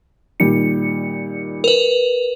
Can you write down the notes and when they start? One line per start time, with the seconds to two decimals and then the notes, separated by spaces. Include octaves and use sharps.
0.40 A#2 D#3 G3 C#7
1.64 A#4 B4